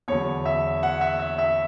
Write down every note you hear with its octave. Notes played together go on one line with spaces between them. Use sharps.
E2 D3 F#3 C#5
E5
F#5
E5
E5
E5